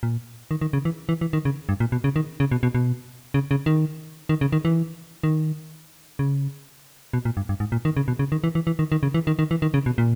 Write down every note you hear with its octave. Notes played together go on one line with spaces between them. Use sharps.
A#2
D#3
D#3
C#3
E3
E3
E3
D#3
C#3
G2
A#2
B2
C#3
D#3
C#3
B2
B2
B2
C#3
C#3
D#3
D#3
C#3
D#3
E3
D#3
C#3
B2
A#2
G2
G2
G#2
A#2
D#3
C#3
B2
C#3
D#3
E3
E3
E3
D#3
D#3
C#3
E3
D#3
D#3
E3
D#3
C#3
B2
A#2